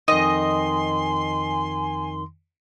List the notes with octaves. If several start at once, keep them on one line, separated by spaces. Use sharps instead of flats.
F2 D#3 D#5 G#5 C6